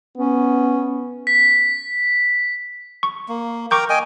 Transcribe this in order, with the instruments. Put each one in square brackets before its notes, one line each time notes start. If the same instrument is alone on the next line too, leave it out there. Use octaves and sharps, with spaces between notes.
[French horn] B3 [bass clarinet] C#4
[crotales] B6
[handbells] C#6
[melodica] A#3
[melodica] A#4 G5 A#5 [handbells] C#6 D6 G6
[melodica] D#5 G5 G#5